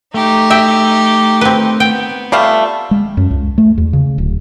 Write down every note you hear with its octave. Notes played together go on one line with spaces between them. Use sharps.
A3 D#4 G4
E5 G5
C4 B4
B3 G5
G3 A3 F4 E5 F5
G#3
F#2
C#2
A3
E2
C#3
D1